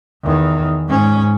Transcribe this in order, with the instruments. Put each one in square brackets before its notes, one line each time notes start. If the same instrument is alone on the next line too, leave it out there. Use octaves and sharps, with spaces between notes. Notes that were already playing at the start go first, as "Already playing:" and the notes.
[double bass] E2 D#3
G#2 C#4